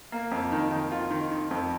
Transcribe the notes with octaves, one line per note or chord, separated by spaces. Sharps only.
A#3
F2
D#3
D#3
F4
D#3
D#3
F2